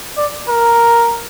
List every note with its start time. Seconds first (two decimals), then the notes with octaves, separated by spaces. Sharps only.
0.17 D5
0.49 A#4